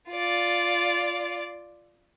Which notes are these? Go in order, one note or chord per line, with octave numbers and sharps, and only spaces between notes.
F4 D5